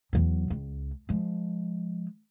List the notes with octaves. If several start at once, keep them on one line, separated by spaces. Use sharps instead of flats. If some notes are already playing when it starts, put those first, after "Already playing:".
E2 F#3
C#2
F3 G#3